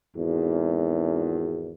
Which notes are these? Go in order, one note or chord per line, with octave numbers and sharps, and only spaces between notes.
G#1 E2